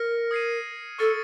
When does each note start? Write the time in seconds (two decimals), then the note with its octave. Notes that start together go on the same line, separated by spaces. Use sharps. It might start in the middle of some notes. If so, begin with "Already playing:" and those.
Already playing: A#4 F6 A#6 C#7
0.31 D#6 G#6 C7 D#7
0.98 A4 C#6 F6 A6 C#7